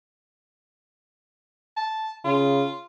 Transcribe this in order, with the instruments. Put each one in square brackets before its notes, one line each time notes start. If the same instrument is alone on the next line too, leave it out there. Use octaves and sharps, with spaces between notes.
[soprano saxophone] A5
[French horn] C#3 [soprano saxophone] F4